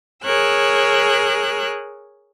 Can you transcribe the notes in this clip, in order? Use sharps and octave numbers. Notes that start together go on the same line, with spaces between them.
G#4 A#4 C#5 E6 F#6